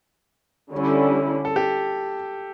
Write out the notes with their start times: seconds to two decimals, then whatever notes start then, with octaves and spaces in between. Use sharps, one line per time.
0.72 D3 G3 C#4 E4
1.45 A4
1.56 G4